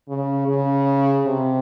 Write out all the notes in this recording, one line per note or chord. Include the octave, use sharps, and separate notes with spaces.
C#3
C#3
C3